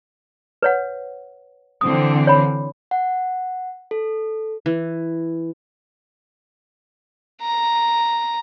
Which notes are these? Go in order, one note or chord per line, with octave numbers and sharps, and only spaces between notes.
B4 C#5 F#5
D3 E3 C4 D#6
C#5 B5
F#5
A4
E3
A#5